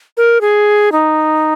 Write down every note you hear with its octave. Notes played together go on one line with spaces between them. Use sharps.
A#4
G#4
D#4